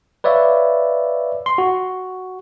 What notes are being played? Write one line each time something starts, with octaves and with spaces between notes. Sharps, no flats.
B4 C#5 D5 E5 F5
C6
F#4